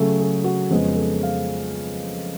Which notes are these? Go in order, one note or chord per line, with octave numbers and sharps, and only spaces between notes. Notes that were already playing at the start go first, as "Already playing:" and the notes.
Already playing: C#3 F#3 A3 A4
G#4
F#4
F2 C#3 G#3 B3 G#4
A4
F5